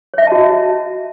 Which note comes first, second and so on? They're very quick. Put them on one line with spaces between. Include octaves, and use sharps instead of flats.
C#5 E5 D#5 A5 F#4